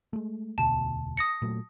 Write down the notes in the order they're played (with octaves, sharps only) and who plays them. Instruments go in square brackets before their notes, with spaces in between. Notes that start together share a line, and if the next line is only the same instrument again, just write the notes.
[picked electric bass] G#3 A3
[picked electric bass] E1 D2 B2 [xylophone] A5
[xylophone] D#6 A#6 C#7
[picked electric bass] A#2 F#3 A3